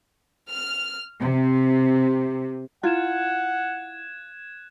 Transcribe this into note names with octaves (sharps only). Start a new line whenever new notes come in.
F6
C3
E4 F4 F#5 F#6 G#6 E7